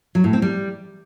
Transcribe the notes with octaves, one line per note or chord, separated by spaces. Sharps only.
F#3
A2
C4
G3